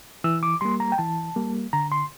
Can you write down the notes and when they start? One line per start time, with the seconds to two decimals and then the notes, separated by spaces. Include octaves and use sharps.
0.24 E3 E6
0.43 D6
0.61 G3 A#3 C6
0.80 A#5
0.92 G5
0.98 E3 A5
1.36 G3 A#3
1.73 D3 A#5
1.92 C6